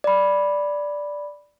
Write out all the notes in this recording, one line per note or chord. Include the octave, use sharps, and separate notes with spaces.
D5 B5